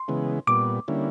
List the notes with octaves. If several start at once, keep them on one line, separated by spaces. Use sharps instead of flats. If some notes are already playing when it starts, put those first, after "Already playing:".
Already playing: C6
C#3 E3 G#3 B3
A#2 G3 B3 D6
D3 G3 A#3 C#4 E4